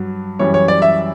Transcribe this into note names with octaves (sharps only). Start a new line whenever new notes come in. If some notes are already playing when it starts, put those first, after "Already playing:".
Already playing: G2 F#3
F#2 E3 G3 C#5
C#5
D5
E5